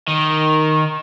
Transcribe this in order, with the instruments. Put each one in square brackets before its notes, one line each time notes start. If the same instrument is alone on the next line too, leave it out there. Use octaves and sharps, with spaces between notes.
[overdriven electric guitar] D#3